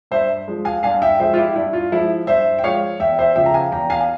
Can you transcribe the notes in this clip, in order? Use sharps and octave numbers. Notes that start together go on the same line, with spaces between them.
G2 C5 E5
F3 G#3
F5 G#5
G2 F5 G#5
E5 G5
F3 G#3 C5 E5
F4
E4 G4
G2 E4
F4
F3 G#3 E4
G2 C5 E5
G5
F3 G#3 C#5 F5
E2 E5 G5
C5 E5
C#3 F3 E5 G5
A#5
F5 G#5
E2 G5 A#5
F5 G#5
G#5